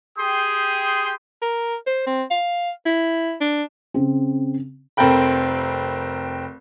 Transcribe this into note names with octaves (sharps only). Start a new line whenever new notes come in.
G4 G#4 G5 C6 D#6
A#4
C5
C4
F5
E4
D4
C#3 C4
F1 C4 A4 A#4 G5 B5